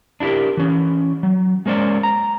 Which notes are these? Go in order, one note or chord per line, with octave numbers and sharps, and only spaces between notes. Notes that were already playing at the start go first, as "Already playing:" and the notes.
D4 E4 F#4 G4 A#4
E3 C#4
F#3
G#3 A#3 C#4 C5 D5
A#5